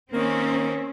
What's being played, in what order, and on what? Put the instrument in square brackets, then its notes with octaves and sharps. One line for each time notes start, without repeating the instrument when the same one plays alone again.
[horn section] D#3 A#3 [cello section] C4 C#4